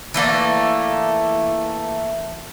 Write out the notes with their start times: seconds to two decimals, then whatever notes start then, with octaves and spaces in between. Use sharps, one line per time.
0.14 E3 A3 A#3 D5